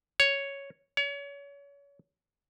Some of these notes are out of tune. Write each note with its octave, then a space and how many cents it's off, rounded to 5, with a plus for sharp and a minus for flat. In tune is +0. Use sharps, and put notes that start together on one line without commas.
C#5 +0
C#5 +30